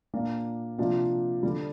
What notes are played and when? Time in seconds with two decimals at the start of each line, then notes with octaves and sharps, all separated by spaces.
0.14 A#2 A#3 D4
0.78 C3 F3 A#3 D4
1.43 D3 G3 D4